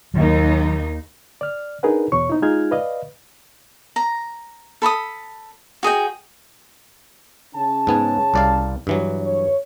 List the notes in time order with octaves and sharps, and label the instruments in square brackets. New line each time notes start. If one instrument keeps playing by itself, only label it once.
[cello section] D#2 D#4 [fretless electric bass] D#3 F#3
[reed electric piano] D5 F6
D4 D#4 G#4 A#4 B4 F#5
E2 B2 C#5 C#6
C4 D#4 E4
G#3 D#4 F4 G#4 F6 G#6
B4 D5 D#5 F5
[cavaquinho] A#5
A4 B5 C#6 D#6
F#4 G#4 D#5 G5
[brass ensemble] C#3 C#4 A5
[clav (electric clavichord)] G#2 B3 G#5
C2 D5 F5
G2 E3 F#3
[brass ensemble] C#5